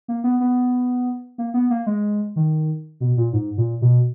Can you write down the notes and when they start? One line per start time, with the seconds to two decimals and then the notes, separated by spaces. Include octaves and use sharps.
0.08 A#3
0.24 B3
0.40 B3
1.38 A#3
1.54 B3
1.70 A#3
1.87 G#3
2.36 D#3
3.00 B2
3.17 A#2
3.33 G#2
3.58 A#2
3.82 B2